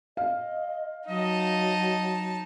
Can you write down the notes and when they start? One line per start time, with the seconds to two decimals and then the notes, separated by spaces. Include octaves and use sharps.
0.17 D#5 F5
1.08 F#3 D#4 D#5 A5